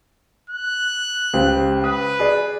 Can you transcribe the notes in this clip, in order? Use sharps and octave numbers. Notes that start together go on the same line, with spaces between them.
F#6
C#2 G4 C5
B4 D#6
G#4 D5